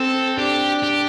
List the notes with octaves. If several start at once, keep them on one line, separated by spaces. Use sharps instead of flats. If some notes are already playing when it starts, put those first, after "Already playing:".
Already playing: C4 A4
D4 G4
G4